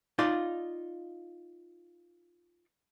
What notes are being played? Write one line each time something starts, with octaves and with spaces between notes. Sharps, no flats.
D#4 F4 D5